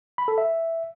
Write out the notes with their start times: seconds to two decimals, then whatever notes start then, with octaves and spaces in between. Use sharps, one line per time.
0.18 B5
0.28 A4
0.38 E5